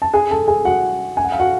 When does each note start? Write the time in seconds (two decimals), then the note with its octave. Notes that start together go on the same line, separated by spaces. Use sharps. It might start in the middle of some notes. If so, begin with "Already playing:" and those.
0.02 A5
0.13 G#4 G#5
0.31 A4 A5
0.48 G#4 G#5
0.65 F#4 F#5
1.17 G#5
1.25 F#5
1.32 F5
1.40 F#4 F#5